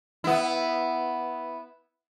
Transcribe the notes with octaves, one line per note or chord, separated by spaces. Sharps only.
B3 E4